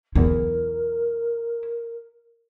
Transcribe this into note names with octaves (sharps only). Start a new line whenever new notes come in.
B1 E2 E4 A#4